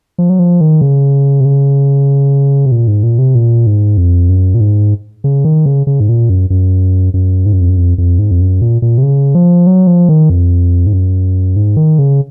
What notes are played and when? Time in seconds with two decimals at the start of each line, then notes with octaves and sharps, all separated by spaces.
0.18 F3
0.30 F#3
0.39 F3
0.61 D#3
0.81 C#3
1.40 C3
1.45 C#3
2.65 C3
2.72 A#2
2.87 G#2
3.03 A#2
3.18 C3
3.35 A#2
3.67 G#2
3.97 F2
4.29 F#2
4.54 A#2
4.61 G#2
5.24 C#3
5.45 D#3
5.66 C#3
5.87 C#3
6.00 G#2
6.09 A#2
6.30 F#2
6.50 F#2
7.14 F#2
7.46 G#2
7.53 F#2
7.61 F2
7.69 F#2
7.77 F2
7.98 F2
8.19 G#2
8.31 F2
8.41 F#2
8.62 A#2
8.82 A#2
8.98 C3
9.03 C#3
9.35 F3
9.67 F#3
9.87 F3
10.09 D#3
10.30 F2
10.86 G#2
10.93 F#2
11.56 G#2
11.77 D#3
11.99 C#3